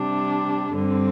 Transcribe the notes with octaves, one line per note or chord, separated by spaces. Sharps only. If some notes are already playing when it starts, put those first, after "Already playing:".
Already playing: C3 G3 D4
G2 D3 G3 C4